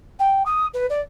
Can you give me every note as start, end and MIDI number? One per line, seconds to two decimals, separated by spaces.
0.19 0.43 79
0.46 0.66 87
0.74 0.86 71
0.90 1.01 74